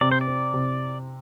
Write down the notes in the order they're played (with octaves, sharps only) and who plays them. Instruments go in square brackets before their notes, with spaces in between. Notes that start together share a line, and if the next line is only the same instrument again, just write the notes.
[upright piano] C3 [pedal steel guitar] D5
[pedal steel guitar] C5
D5
[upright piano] C4
C3